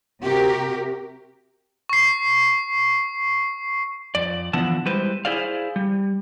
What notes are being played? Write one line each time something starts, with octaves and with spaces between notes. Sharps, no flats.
C3 F#4 G4 A#4
C#6 C7
F2 D5
D3 E3 F3 B3 F#5 A5
G3 G#3 E4 B4 C5
E4 G#4 C5 D5 F5
G3